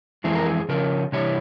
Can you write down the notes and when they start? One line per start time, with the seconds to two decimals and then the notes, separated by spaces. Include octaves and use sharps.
0.24 F2 E3 G#3 C4 E4 G#4
0.35 A#4
0.46 G#4
0.69 C#3 F3 C#4 A#4
1.12 C3 E3 G3 E4 C#5